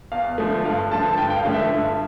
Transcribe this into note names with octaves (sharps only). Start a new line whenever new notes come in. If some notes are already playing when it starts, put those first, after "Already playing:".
E2 F5
D3 F3 A3
G2 F5
D3 F3 A3 A5
A5
G2 G5
G5
F5
D3 F3 A3
E5
G2